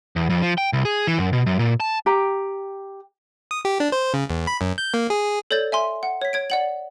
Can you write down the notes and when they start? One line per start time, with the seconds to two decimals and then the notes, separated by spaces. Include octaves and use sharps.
0.16 E2
0.30 F2
0.42 F3
0.58 G5
0.73 C2
0.85 G#4
1.07 E3
1.19 F#2
1.33 B2
1.46 F#2
1.59 A#2
1.80 A5
2.06 G4 G5 A#5
3.51 D#6
3.65 G4
3.80 D4
3.92 C5
4.14 C#3
4.30 E2
4.47 B5
4.61 F#2
4.78 G6
4.94 A#3
5.10 G#4
5.51 A4 C#5 D5 G6 A6
5.72 E5 G#5 C6
6.03 F#5
6.22 C#5 B6
6.33 C#5 G#6 D7
6.50 D5 F#5 F#7